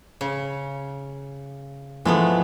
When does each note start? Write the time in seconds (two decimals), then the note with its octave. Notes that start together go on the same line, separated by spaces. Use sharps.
0.21 C#3
2.05 E3 F3 G#3 A3 B3